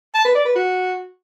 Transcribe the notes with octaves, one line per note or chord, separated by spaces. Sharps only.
A5
B4
D5
B4
F#4